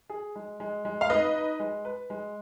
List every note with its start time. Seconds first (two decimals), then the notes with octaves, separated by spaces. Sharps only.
0.09 G#4
0.35 G#3
0.60 G#3
0.85 G#3
1.01 F5
1.10 D#4 B4 D#5
1.35 D#4
1.59 G#3
1.85 B4
2.10 G#3